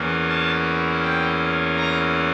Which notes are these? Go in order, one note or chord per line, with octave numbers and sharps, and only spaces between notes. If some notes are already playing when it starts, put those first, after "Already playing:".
Already playing: E2 E3 A#3 C#4
A5
G5
A#5